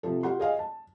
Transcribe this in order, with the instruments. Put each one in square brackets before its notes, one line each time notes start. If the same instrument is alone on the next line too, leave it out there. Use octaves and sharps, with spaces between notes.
[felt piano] C3 F3 A4
F4 G4 F#5 C6
G#4 D#5 F5 G#5
A5